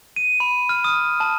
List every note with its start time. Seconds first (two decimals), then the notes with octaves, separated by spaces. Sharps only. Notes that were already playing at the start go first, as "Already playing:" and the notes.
0.16 D#7
0.40 B5
0.69 F6
0.84 D#6
1.20 A5